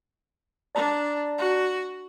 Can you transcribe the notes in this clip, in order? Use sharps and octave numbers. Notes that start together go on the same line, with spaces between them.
D4 D5 A5 A#5
F#4